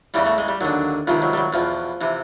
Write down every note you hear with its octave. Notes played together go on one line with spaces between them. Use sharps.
E2 C#3 E3 G3
A3
G#3
G3
D#2 D3 F#3
C#2 C3 D#3 F3
F#3
G3
F#3
E2 B2 F3
C3 E3